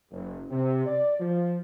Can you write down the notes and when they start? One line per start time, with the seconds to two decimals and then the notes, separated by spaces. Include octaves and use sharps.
0.11 F#1
0.50 C3
0.86 D5
1.20 F3